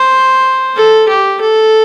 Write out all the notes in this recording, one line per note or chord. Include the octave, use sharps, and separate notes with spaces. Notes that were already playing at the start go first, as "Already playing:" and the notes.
Already playing: C5
A4
G4
A4